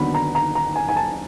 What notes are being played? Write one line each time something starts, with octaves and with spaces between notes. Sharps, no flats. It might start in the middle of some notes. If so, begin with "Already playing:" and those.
Already playing: D#2 D3 F#3 B3 D4 B5
A#5
A#5
A#5
G#5
G#5
A5